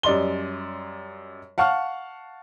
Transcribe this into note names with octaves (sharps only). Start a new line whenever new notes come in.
F#2 G3 D5 D#5 C6 G7
F5 F#5 A5 C#6 F6